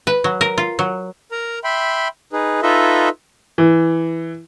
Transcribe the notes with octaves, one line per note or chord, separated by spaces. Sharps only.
B4
F#3
A#4
F4
F#3
A#4 A#5
E5 G5 B5 C6
D#4 G#4 B4
D#4 F4 A4 B4 D#5 E5
E3